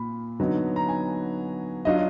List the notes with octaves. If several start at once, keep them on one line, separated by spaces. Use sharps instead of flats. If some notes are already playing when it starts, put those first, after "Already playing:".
Already playing: A#2 F4 B5
D3 F#3 B3 D#4
A#5
G#5
F#3 D4 F4 D#5